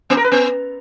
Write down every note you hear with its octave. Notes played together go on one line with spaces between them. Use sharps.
B3
A#4
B4
B3